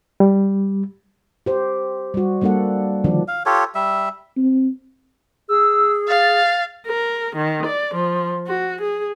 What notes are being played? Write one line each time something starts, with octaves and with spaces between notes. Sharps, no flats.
G3
G4 C5
G3 F#4
G3 A#3 D4 A4 F#5
D3 D#3 F3 D4
F5
F4 G4 A4 C#5
G3 E5
C4
G#4 E6
F5 A6
A#4
D#3
D5
F3
F#4
G#4